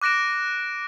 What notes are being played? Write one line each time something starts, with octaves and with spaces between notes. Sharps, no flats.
D6 F#6 A#6 D7 E7